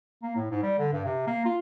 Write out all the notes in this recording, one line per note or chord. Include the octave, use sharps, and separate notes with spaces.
A#3
A2
G#2
G3
D3
G2
C3
A#3
F4